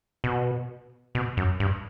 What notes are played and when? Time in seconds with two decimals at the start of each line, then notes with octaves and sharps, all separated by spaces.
0.24 B2
1.15 B2
1.37 F#2
1.60 G2